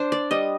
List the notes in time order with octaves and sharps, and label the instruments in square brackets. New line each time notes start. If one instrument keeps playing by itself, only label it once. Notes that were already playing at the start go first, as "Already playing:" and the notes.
Already playing: [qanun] D4 C5
D5
G3 D#5